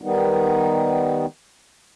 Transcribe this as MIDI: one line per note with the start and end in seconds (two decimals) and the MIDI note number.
0.02 1.26 51
0.02 1.26 55
0.02 1.26 59
0.02 1.26 63